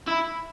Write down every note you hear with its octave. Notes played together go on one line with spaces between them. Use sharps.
E4